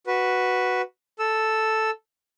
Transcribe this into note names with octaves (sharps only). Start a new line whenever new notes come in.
F#4 B4
A4 E6